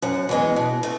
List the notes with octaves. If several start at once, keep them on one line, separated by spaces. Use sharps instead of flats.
F#2 F#5
E3 G#3 B3
B2
A3